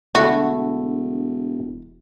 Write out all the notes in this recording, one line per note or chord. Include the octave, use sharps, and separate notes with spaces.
E1 D3 A3 E4 F#4